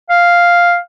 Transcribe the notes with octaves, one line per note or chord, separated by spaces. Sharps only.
F5